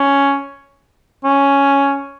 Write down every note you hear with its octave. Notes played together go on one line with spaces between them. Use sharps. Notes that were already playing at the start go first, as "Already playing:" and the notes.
Already playing: C#4
C#4